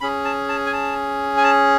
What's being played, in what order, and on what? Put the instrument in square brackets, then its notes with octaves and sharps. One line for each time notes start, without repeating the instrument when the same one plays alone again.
[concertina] C#4 G#4 B5
A5
A5
G#5
A5
G#5
A5